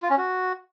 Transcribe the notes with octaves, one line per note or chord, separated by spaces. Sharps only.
F4
C#4
F#4